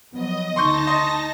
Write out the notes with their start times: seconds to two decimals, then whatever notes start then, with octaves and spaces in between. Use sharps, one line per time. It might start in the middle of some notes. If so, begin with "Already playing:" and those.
0.14 F3 F#3 B3 D#5
0.56 D2 C#3 D#4 A5 C6 C#6 G6 A#6
0.87 D#5 C6